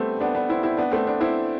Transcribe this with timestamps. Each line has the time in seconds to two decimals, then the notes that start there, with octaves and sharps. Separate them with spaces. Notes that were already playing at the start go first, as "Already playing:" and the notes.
Already playing: G3 A3 B3 C4
0.21 B3 D4
0.35 B3 D4
0.49 C4 E4
0.63 C4 E4
0.77 B3 D4
0.92 A3 C4
1.07 B3 D4
1.21 C4 E4